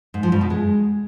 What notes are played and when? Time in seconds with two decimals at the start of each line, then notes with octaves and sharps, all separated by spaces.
0.14 G#2
0.23 F3
0.32 G2
0.41 B2
0.50 G#3